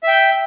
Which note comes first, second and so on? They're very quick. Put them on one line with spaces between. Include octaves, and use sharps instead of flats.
E5 G5 G6